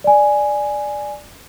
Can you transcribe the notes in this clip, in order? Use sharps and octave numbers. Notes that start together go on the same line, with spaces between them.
D5 G#5